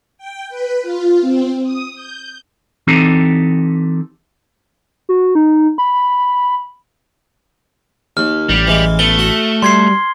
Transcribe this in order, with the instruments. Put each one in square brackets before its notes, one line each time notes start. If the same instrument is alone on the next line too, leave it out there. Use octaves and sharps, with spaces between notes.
[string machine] G5
B4
F4
C4
D#6
G6
[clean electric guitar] E3 C4 D#4 G4 A4
[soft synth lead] F#4
D#4
B5
[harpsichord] D#2 [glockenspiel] F6
[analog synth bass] A1 [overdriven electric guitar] G3
[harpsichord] E3 G#3
[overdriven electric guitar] A3 [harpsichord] B3 [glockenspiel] G7
[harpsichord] F#4
[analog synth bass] G3 [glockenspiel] C6 G#6 C7